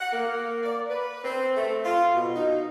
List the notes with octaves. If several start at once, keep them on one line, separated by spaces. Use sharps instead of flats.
F#5
A#3
D5
B4
C4
A3
F4
B2
D#4